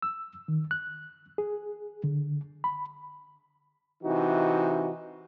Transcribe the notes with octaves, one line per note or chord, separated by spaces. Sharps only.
E6
D#3
F#6
G#4
D3
B5
C3 E3 D#4 F#4